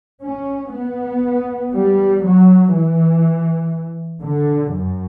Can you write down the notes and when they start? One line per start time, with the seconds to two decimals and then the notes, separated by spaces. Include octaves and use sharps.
0.23 C#4
0.73 B3
1.72 G3
2.22 F#3
2.72 E3
4.21 D3
4.71 F#2